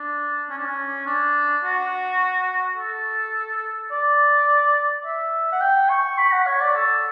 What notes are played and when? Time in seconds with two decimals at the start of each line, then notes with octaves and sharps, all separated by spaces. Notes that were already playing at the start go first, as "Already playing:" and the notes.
Already playing: D4
0.50 C#4
0.58 D4
0.65 C#4
1.06 D4
1.64 F#4
2.77 A4
3.91 D5
5.05 E5
5.52 F#5
5.61 G5
5.90 C#6
6.18 B5
6.32 F#5
6.46 C#5
6.61 D5
6.75 A4